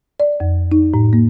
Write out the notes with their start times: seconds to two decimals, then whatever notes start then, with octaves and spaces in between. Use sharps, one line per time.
0.20 D5
0.40 F2
0.72 D#4
0.94 A2
1.13 A#3